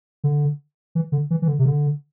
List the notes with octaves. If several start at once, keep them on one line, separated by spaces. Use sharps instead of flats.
D3
E3
D3
E3
E3
D3
C3
D3